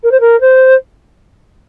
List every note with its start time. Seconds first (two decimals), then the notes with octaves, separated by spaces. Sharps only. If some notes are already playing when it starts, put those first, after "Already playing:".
0.03 A#4
0.11 C5
0.20 A#4
0.41 C5